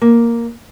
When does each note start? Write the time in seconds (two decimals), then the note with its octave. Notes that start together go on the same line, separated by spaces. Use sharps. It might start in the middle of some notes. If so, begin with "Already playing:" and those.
0.02 A#3